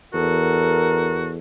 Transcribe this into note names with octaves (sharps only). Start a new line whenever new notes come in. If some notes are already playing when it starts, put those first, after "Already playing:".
E2 F#4 A4 A#4